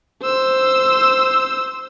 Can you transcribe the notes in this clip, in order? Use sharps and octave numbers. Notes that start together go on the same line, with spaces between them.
C5 E6